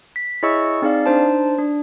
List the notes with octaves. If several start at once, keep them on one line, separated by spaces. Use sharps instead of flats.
B6
E4 G#4 C#5 D#5 C#6 E6
C4 D#4 G#4 D5 F5
D4 D#4 C5 A5
D4